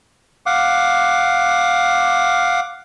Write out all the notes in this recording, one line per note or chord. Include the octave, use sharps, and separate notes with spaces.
F5 F#5 D6